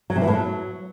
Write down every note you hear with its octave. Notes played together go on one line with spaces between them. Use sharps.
F#3
C3
E3
A2
F#3